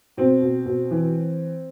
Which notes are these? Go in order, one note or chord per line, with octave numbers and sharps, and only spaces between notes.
B2 C4
B2
B2
E3